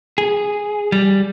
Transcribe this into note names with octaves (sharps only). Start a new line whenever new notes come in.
G#4
G3